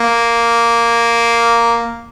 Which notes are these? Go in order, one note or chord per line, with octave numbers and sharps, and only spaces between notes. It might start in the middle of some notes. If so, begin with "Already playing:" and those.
Already playing: A#3